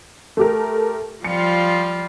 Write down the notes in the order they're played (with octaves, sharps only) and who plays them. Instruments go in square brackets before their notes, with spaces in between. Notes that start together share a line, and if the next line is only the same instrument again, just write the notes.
[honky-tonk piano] A3 G4 A#4
[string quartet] F3 G3 F4 [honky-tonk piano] C#7